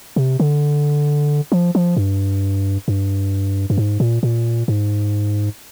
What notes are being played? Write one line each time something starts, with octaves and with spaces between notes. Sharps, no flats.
C3
D3
F3
F3
G2
G2
G2
G#2
A#2
A#2
G#2